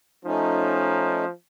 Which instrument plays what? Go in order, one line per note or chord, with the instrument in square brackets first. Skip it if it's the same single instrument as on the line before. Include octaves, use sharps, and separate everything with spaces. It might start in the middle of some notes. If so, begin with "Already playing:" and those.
[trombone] F3 [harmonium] A3 C#4 D#4